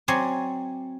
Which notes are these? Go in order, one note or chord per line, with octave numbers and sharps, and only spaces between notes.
F#3 C4 C#5 D5 G#5 C6